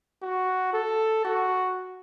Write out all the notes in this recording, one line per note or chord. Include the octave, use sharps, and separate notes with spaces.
F#4
A4
F#4